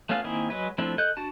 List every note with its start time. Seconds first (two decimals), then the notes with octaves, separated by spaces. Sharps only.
0.09 A3 B3 C#4 F4 F5
0.24 D#3 A#3 C4 E4 G#4
0.50 F#3 G#3 B4
0.78 F3 A3 C4 D4 E4
0.98 A4 D#5 F#6 G6
1.17 D4 F#4 A5